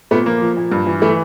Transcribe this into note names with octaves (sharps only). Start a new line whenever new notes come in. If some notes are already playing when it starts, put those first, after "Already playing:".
A#2 A3 B3
F3 A#3
F3
A#2
G2
E3
E3 A3